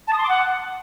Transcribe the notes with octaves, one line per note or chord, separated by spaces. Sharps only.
A5
D#6
C6
D6
F#5